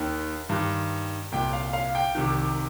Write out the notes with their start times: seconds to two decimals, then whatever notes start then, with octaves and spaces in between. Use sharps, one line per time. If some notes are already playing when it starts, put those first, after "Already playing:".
Already playing: D#2 D#3
0.49 G2 D#3
1.32 C2 A#2 G5
1.53 F5
1.73 F5
1.95 G5
2.15 C2 C3 D#3